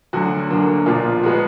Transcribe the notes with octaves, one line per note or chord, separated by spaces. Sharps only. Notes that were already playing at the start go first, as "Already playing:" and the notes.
D2 D3 F#3 F#4
D2 D3 F#3 A#3
B1 A#2 F3 F4
F3 G#3 B3 F#4